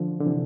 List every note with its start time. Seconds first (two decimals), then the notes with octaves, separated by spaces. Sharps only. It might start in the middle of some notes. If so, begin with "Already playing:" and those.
Already playing: D3 F3
0.20 D3
0.26 C3 E3